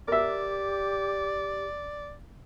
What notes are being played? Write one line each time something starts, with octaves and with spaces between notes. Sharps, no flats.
G4 A#4 D5 E5